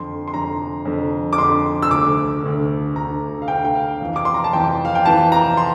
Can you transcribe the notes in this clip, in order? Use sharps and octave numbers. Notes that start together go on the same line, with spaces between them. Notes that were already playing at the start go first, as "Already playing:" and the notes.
Already playing: F2 D3 C6
C6
F2 D3 A#5
F2 D3
D6
F2 D3 C6
E6
D2 D3 D6
D2 D3
D2 D3 A#5
F5
D2 D3 G5
G5
F5
F2 E3
D6
C6
A#5
A5
F2 E3 G5
F5
G5
F2 E3 A5
A#5
C6